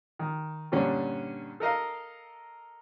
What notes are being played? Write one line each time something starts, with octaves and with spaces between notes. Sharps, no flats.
D#3
G2 A#2 D3 C#4
A4 A#4 D#5 F5